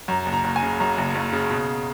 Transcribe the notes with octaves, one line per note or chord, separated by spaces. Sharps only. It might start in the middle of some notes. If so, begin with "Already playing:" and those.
F#2 A#5
F#1
A#5
F#1
G#5
C#3
F#2 A#5
F#1
F#1
C#3
B2